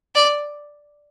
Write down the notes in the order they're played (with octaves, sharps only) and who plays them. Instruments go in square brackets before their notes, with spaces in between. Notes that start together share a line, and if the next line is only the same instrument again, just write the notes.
[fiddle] D5